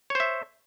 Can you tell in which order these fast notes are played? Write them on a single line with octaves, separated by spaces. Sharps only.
C#5 C5 E5